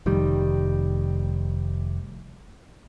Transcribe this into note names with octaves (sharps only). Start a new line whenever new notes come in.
F1 D#3 G3